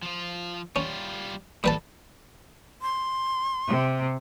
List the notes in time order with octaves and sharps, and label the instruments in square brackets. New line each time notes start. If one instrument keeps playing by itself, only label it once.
[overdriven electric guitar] F3 F4
[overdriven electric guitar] G3 F4 [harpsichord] C#4
[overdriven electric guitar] A2 A4 [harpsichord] G3 B4 A5
[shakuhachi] C6
[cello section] C3